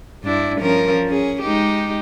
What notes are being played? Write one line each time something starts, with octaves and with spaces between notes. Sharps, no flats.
G2 D4 E4
F3 C#4 A#4
C#4 G#4
G#3 D#4 G4